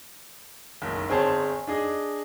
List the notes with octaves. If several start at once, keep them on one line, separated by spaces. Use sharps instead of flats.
F#1 B1
G1 C4 G#4 C5 C#5 A5
D4 G#4 D#5